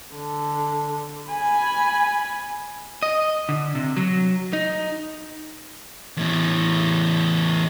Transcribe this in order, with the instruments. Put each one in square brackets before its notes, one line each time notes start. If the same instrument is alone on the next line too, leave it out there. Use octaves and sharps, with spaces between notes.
[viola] D3
G#5 B5
[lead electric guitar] D#5
D3
C3
F#3
D#4
E2 A2